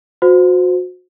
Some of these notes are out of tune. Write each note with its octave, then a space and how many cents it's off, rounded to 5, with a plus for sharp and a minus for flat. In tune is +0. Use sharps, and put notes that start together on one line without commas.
F#4 -30 C5 -20